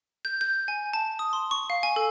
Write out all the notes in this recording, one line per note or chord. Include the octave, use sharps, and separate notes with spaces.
G6
G6
G#5
A5
D#6
C6
C#6
F5
G#5
A4